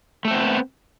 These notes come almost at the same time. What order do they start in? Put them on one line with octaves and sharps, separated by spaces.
A3 A4 C4 B3